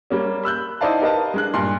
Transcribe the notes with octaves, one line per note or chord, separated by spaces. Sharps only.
G3 A#3 C#4
B5 E6 F#6 G6
D#4 E4 C5 D5 F5 A5
G4 A#4 B4 D#5 F5 A5
G#3 D4 F#6
G2 A#2 C6